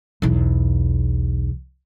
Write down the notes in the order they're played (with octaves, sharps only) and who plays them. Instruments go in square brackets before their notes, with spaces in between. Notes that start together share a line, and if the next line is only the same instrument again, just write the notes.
[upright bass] B1 E2